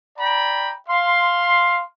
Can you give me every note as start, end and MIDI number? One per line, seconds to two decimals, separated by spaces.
0.18 0.73 74
0.18 0.73 79
0.18 0.73 82
0.18 0.73 83
0.89 1.83 77
0.89 1.83 84